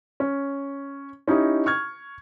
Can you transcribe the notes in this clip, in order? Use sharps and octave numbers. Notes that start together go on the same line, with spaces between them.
C#4
C#4 D#4 E4 G4 D#5
C#6 F6 G#6